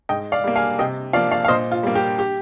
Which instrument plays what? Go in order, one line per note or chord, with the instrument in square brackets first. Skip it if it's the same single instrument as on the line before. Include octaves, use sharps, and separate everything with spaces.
[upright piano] G#2 D#5 G5
D5 F5
G3 A#3
F5 G#5
C3 D#5 G5
F3 D5 F5
A#3
D5 F5
F5
A#2 C5 D#5
F4
G3 A#3
G4
G4